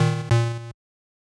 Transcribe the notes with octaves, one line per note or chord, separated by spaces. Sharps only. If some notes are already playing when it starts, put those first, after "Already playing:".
Already playing: A#2 D#3
A#2